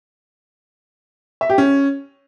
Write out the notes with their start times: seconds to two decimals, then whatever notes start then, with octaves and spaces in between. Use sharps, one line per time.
1.41 E5
1.50 G4
1.58 C#4